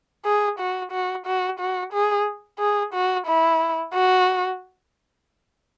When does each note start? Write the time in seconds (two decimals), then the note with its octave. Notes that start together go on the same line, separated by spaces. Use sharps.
0.25 G#4
0.59 F#4
0.92 F#4
1.26 F#4
1.59 F#4
1.93 G#4
2.59 G#4
2.94 F#4
3.27 E4
3.94 F#4